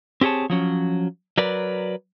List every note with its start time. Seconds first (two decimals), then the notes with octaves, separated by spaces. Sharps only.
0.21 C4 G4 G#4 C#5 A5
0.50 F3 F#3 C#4
1.38 F#3 A#4 B4 D5